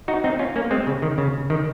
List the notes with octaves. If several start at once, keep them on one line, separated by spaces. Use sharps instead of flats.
D#4 F#4
C4 D#4
C#4 F4
A#3 C#4
G#3 C4
C#3
D#3
C#3
D#3